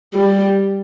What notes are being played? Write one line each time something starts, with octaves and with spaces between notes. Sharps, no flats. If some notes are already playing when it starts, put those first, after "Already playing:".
G3